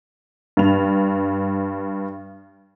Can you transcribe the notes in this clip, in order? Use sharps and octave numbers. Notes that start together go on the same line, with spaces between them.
G2 F7